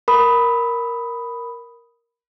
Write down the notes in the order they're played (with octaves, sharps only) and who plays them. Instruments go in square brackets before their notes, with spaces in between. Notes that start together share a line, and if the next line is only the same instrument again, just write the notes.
[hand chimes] A#4 B5 D#6